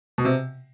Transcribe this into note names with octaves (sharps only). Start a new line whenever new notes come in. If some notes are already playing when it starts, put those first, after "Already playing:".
B2
C3